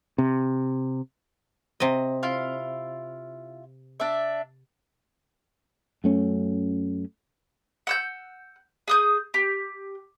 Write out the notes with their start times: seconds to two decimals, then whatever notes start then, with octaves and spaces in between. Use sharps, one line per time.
0.18 C3
1.80 C3 D#5
2.23 E4 F4 F5
4.00 D4 E5
6.04 F#2 A3 C#4
7.87 F#5 E6 G6
8.88 G#4 D#6 G6
9.34 G4